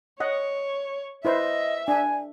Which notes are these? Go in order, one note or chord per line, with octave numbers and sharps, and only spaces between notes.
C#5 D#5 F#5
E4 B4 C5 D#5 E5
D4 G#5